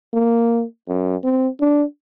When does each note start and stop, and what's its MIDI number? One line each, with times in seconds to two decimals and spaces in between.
0.13 0.64 58
0.88 1.16 42
1.24 1.48 60
1.60 1.84 62